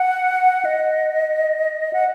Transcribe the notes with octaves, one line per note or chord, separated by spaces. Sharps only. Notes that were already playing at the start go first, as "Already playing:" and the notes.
Already playing: F#5
D#5
F#5